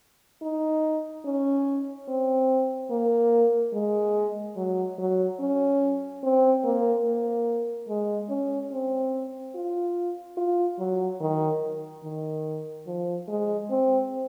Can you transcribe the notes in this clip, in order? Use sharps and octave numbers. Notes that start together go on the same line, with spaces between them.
D#4
C#4
C4
A#3
G#3
F#3
F#3
C#4
C4
A#3
A#3
G#3
C#4
C4
F4
F4
F#3
D#3
D#3
F3
G#3
C4